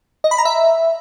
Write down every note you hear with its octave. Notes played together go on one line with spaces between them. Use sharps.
D#5
B5
A#5
E5